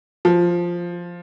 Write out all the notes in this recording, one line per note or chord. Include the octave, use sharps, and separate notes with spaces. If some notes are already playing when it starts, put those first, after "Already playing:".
F3